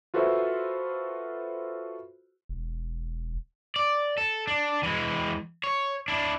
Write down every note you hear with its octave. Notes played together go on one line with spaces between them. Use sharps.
F4 F#4 A4 B4 C5 E5
E1
D5
A4
D4
E3 G#3
C#5
D4 E4